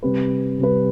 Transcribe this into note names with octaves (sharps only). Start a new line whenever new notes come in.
C3 G3 C4 G4 B4
C3 G3 C4 G4 B4